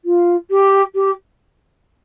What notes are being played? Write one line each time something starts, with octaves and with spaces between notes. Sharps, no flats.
F4
G4
G4